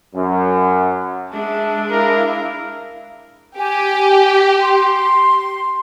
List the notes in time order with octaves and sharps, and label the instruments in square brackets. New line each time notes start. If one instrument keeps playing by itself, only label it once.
[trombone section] F#2
[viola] G#3 D4 [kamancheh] E5 A5
[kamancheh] E4 F5 [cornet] A#4
[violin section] G4 [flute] G#5
[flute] C6